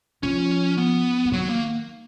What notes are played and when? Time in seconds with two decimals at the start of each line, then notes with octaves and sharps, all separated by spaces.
0.23 F3 C#4
0.78 B3
1.25 F3
1.32 D#3 F#3
1.49 A#3